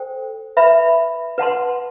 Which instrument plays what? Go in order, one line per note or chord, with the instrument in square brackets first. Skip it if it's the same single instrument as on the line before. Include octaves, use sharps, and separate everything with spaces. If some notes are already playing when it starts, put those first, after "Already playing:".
Already playing: [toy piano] A4 C5 G5
B4 E5 B5
B4 F#5 A5 C6